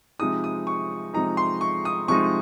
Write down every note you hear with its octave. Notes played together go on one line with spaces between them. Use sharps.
C3 F3 G#3 D#4 D#6
D#6
C#6
C3 F3 G#3 D#4 A#5
C6
C#6
D#6
C3 F3 G#3 D#4 C#6